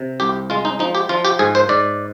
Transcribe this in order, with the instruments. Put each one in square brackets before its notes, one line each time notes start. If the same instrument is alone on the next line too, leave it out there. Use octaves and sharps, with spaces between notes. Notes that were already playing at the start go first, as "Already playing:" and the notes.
Already playing: [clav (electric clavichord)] C3
C2 G4
G#3 F4
D#4
F3 D#4
G4
F3 F4
G4
G#2 G#4
C5
G#2 D5